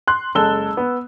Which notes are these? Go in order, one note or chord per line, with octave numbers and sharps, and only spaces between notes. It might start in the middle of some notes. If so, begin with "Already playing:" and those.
C6 F#6
F#1 G#3 A4 A5 E6 G7
B3